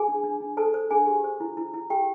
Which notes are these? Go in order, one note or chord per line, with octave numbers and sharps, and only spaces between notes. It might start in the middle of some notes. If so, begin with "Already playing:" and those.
Already playing: G#4 G#5
D4
D4
D4
A4 C5 A5
C5
D4 G#4 G#5
G4
C5
E4
E4
E4
G4 G5